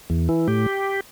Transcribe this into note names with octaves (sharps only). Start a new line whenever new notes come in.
E2
E3
A2 G4